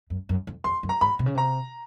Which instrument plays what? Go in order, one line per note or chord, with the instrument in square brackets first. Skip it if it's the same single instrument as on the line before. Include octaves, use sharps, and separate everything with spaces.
[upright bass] F#2
F#2
F2
[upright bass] F2 [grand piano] C6
[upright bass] F#2
[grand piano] A#5
[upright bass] G#2 [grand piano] B5
[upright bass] C3
C#3
[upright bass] C3 [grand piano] A#5